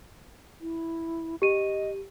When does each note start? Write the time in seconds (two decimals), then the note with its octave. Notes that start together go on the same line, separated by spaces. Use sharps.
0.61 E4
1.42 G4 D#5 D#7